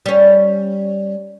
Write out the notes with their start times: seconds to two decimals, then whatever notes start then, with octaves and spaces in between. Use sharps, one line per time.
0.06 G3 C#4